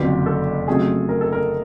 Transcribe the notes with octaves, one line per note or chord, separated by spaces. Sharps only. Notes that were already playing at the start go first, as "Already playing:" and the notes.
Already playing: F#1 F2 D3 F#3 B3 G4
A4
F2 C#3 F#3 A3 G#4
A#4
A4
A#4